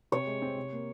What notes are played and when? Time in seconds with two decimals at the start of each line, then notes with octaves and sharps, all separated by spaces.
0.12 C3 C#5
0.26 G#3
0.42 C4
0.57 C3
0.72 A#3